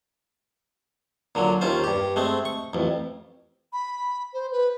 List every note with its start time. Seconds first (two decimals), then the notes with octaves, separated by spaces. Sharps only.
1.35 A#2 D3 F#3
1.61 D#2 C#4 F4 C5
1.84 G2 G4
2.16 G#3 A3 C4
2.45 C#6
2.73 A1 F2
3.73 B5
4.34 C5
4.52 B4